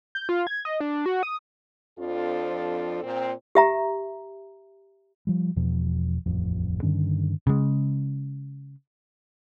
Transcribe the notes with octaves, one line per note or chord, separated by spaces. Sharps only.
G6
F4
G#6
D#5
D4
F#4
D#6
F2 F3 C4 D4 F4 A4
A#2 C4
G4 E5 A#5
F3 G3
E1 E2 B2 F3
D#1 A1 F2
G2 D3 D#3 C#4
C#3 G#3